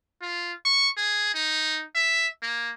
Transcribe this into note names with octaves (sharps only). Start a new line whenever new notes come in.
F4
C#6
G#4
D#4
E5
A#3